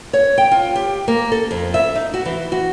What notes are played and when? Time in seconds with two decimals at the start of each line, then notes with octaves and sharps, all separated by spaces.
0.13 C#5
0.38 G5
0.51 F4
0.76 G4
1.08 A#3
1.32 A4
1.51 F2
1.74 E5
1.95 D#4
2.14 F#4
2.25 E3
2.52 F#4